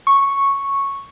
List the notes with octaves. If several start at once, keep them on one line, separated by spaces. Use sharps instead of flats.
C#6